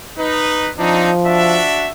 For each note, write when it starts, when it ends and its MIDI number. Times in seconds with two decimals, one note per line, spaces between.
0.19 0.71 63
0.19 0.71 71
0.79 1.62 53
0.79 1.11 60
0.79 1.11 62
0.79 1.11 63
1.26 1.91 62
1.26 1.91 66
1.26 1.91 76